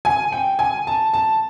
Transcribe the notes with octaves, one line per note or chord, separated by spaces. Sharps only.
G#5
G5
G#5
A5
A5